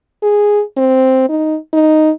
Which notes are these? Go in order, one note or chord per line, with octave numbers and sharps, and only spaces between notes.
G#4
C4
D#4
D#4